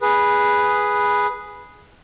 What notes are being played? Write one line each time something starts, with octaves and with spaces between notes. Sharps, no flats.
G#4 B4